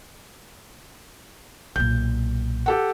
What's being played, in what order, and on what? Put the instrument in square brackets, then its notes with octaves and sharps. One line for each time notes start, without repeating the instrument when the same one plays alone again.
[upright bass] B1 A#2 [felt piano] G6
[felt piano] G4 A4 F#5